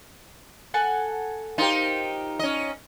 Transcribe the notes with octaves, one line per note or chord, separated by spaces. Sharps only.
A4 F#5 G#5
D#4 F4 G4 A#4 C5
C#4 D#5